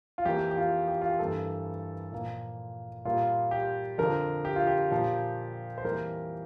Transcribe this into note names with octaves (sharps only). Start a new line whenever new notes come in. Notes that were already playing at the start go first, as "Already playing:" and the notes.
F4
F2 E3 A#3 G4
G4
F4
G4
F4
G4
G2 E3 G3 A#3 A4
A#2 F3 A#3
A#2 G3 A#3 F4
G4
F2 D3 F3 A#4
G4
F4
G4
A#2 F3 A#3
C5
F2 E3 G3 A#3 A#4